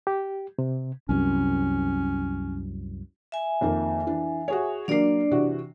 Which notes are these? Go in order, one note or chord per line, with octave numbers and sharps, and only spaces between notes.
G4
C3
C2 F#2 C#4
E5 G#5
F2 D#3 A#3
E3 D4
F#4 G#4 C#5
F#3 A#3 D4 D5 C7
C3 E3 F#4